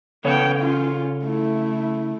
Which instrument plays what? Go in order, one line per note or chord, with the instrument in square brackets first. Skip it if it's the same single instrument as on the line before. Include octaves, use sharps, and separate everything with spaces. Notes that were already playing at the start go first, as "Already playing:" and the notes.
[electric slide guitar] C#3 A4 C#5 [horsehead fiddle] B3 G5
[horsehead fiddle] C#4 F4
A3 E4